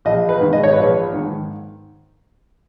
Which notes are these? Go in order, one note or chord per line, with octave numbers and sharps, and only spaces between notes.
A#1 D#5
B4
G#2 D#3
D#5
C#5
A#1 B4
C#5
G#2 D#3